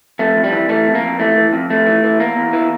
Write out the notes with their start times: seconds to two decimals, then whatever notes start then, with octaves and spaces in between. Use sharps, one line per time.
0.19 F2 A3
0.36 F2
0.44 G3
0.52 E3
0.69 E3 A3
0.86 F2
0.95 A#3
1.03 F2
1.19 E3 A3
1.36 E3
1.53 F2
1.70 F2 A3
1.86 E3
2.04 E3
2.20 E2 A#3
2.36 E2
2.53 E3